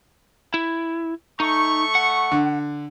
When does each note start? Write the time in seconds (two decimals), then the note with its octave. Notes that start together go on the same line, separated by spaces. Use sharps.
0.54 E4
1.40 A3 D#4 C#6
1.95 F#5
2.32 D3